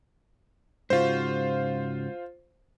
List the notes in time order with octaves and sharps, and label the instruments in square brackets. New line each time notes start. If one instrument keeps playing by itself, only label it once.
[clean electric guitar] G#2 C#3 F#4 [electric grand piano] F4 C5